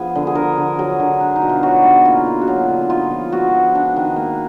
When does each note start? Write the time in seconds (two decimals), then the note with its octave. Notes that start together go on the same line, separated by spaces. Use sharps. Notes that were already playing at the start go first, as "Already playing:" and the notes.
Already playing: F3 B3 G#4
0.15 D3
0.27 G#4
0.35 D4 A#4
0.58 D3
0.79 F#3 G#4
1.00 D3
1.20 D4
1.36 D#4
1.42 B2
1.49 F4
1.63 F#3 F#4
1.84 B2
2.05 A#3 F4
2.26 D4
2.41 F#4
2.47 F#3 F4
2.69 D3
2.89 D#4 F4
3.10 F3
3.32 B3 F#4
3.54 F3
3.75 D4
3.96 D#3
4.16 A#3